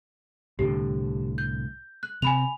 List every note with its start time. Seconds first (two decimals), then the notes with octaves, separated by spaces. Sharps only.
0.59 C2 A2 D3 G4
1.38 G6
2.03 F#6
2.22 C3 C4 G#5 B5 F7